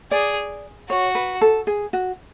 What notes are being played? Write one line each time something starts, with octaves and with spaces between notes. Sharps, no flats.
G#4 D5
F#4 C#5
B4
A4
G#4
F#4